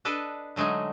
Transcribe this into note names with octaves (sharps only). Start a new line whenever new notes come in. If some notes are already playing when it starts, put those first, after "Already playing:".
D4 A4 B4 D5 D#5
D3 F#3 G#3 A3 D#4